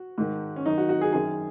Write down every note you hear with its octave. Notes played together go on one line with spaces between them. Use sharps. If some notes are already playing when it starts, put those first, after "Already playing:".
Already playing: F#4
G#2 D#3
C#4
F#2 D#3 D#4
F#4
F#4
G#4
F#2 D#3 G#4